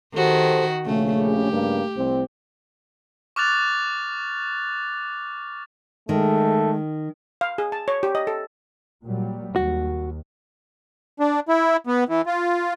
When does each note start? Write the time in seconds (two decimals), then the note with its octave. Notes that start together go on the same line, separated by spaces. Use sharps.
0.14 D#3 F#4 G4 A4 C5
0.85 A#1 C#3 A3
1.21 G4
1.51 G2 C#3 A#3
1.96 C2 C4
3.36 C#6 D6 F6 F#6 A6 F7
6.09 D#3 G#3 A3
7.41 F5
7.58 G#4
7.72 A5
7.88 C#5
8.03 G4
8.15 D#5
8.27 A4
9.05 A#2 F#3 G3
9.56 D#2 F#4
11.20 D4
11.49 E4
11.87 B3
12.09 E3
12.26 F4